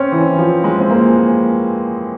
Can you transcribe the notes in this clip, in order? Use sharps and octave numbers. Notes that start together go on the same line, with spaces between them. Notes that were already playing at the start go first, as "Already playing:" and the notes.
Already playing: C4 C#4
E3
F3
G#3
C4
A#3